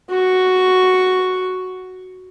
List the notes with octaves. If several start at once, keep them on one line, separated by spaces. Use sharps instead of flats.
F#4 C#6